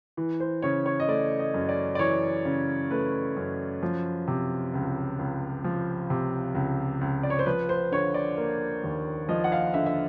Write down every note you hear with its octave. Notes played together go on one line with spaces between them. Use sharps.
E3
C5
C#3 C#5
C#5
D#5
A3 D5
D#5
F#2
D5
D5
E3 C#5
C#3
A3 B4
F#2
F3
C3
C#2
C#2
F3
C3
C#2
C#2
D5
C#5
C5
F3 B4
C5
D3 C#5
D5
A#3
D#2
F3 D#5
F#5
F5
D3 E5
E5